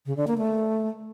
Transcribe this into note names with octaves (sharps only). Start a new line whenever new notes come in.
C#3
D3
A#3
A3